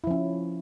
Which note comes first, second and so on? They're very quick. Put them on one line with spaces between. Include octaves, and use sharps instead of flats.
E4 F3 C#4